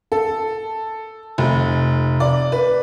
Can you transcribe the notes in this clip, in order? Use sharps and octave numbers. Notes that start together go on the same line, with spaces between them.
A4
F1
D5
B4